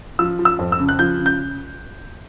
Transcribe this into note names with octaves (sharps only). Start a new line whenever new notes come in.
F3 E6
F3
E6
F2
E6
C#3
F#6
F3 G6
C#3
G6